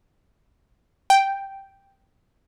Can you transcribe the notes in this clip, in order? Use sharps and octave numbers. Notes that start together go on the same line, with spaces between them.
G5